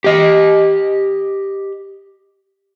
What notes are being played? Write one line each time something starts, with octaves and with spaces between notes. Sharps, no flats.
G4 D#5